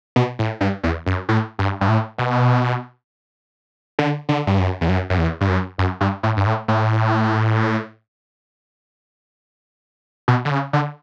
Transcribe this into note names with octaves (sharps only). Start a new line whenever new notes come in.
B2
A2
G2
E2
F#2
A2
G2
G2
A2
B2
D3
D3
G2
F#2
E2
F#2
F#2
E2
G2
F#2
F#2
G2
A2
G2
A2
A2
B2
D3
C#3
D3